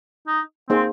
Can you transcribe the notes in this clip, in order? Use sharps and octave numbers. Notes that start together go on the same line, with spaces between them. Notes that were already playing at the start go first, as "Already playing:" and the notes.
D#4
A#3 C4 D#4 G#4 C5